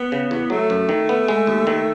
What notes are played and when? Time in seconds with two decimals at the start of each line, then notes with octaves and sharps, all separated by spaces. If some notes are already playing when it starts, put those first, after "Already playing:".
Already playing: B3
0.12 C#3
0.31 E2
0.50 F#3 A3
0.70 F#2
0.89 D#3
1.09 B3
1.28 G#3
1.47 D#2
1.67 D#3